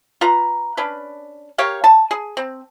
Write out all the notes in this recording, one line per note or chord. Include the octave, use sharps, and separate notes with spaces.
F4 B4 A#5
C#4 D4 B4
A#3 G4 C#5 F5
A5
G#4
C4